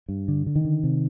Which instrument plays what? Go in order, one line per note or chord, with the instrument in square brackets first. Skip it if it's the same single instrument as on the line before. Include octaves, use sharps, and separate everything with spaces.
[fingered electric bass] G2
D3
D3
D#3
D3
C3